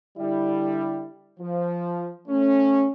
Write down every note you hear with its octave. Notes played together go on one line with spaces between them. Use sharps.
D3 G3 E4
F3
A3 C#4